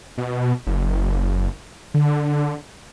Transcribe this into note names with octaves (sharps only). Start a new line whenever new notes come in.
B2
F#1
D3